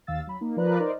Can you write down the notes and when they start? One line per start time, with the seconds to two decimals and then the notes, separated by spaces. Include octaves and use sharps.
0.07 D#2 D#3 F5 E6 A6
0.27 F#3 B5
0.41 A#3 D#4
0.57 F3 A#4 B4 D5 A#5 F#6
0.80 D#4 A#4 C5 D5 D#5